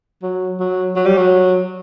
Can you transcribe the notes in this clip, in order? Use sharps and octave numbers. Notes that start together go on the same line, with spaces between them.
F#3
F#3
F#3
G3
F#3